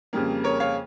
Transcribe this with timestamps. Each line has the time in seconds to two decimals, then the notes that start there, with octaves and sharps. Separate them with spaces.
0.13 F2 C#3 G3 A#3
0.44 A#4 C#5
0.60 C#5 F5